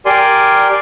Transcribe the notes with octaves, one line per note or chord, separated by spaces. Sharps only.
G4 A#4 D5 G#5 C6